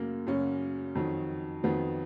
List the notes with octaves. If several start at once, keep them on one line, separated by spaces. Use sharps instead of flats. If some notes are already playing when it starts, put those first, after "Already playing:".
Already playing: F#2 C#3 F#3 A#3
F#2 C#3 F#3 C#4
F2 D#3 F#3
F2 D#3 F#3 B3